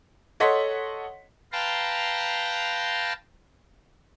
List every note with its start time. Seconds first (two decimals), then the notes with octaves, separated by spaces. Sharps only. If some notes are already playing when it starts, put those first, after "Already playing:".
0.40 A4 C#5 D#5 F#5 C6 B6
1.52 B4 F5 G5 A5 A#5 C6